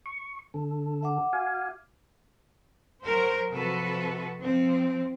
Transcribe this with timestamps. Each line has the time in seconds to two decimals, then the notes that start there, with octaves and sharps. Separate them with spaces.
0.06 C#6
0.54 D3 A4
1.03 E5 F#5 D6
1.33 F#4 F5 G#5
3.03 F#3 A#4 C5
3.52 C3 F3 F#4 A4 B4
4.39 F3 C4